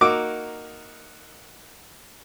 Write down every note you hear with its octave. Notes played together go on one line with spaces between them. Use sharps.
A#3 D#4 F#4 D6 E6